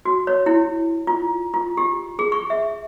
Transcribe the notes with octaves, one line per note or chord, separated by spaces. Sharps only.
F#4
C#5
E4
F4
F4
G4
G#4
C#6
E5